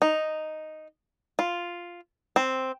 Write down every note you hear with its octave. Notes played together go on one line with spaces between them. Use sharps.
D#4
F4
C4